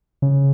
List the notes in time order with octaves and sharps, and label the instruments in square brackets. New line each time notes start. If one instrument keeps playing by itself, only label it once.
[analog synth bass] C#3